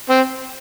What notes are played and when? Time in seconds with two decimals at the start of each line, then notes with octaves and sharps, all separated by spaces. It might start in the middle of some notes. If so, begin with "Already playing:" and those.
0.09 C4